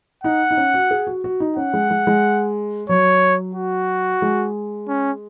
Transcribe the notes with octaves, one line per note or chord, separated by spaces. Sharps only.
D#4 F#5
D#4
C#4
F#4
G#4
F#4
F#4
D#4
C#4 F#5
G#3
G#3
G#3
F#3 C#5
F#4
G#3
C#4